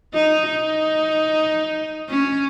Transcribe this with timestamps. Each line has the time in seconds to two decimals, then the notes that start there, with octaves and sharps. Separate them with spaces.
0.14 D#4
0.47 D#4
2.09 C#4